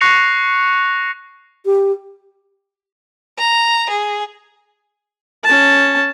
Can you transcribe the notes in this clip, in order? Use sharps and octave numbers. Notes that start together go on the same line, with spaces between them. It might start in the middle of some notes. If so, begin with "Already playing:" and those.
C#6 F#6 A#6 C7 C#7 F7
G4
A#5
G#4
C#4 A5